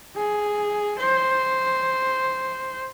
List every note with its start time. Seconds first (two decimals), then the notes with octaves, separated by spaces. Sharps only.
0.16 G#4
0.99 C5